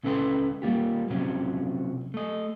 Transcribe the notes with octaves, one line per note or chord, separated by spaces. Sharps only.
C#2 C#4 A4 B4 G5 C6
G3 A#3 F4 G4
C3 F3 F#3 C#4 G4
A3 D#5